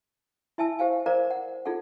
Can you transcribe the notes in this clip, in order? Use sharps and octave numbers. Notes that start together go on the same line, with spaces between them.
E4 E5 G#5 A5 E6
G4 C5 F5 G#5
A#4 C5 D5 F5 A#5 D6
F#5
D#4 F4 G#4 A4 F#5